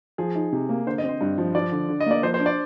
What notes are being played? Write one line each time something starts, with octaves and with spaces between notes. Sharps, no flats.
F3 G#4
D#4
C3
A#3
D3 C5
D#5
C4
C5
G2
F3
F3 D5
D3
D3
D#5
A#3 D5
F3 C5
C5
D4
D5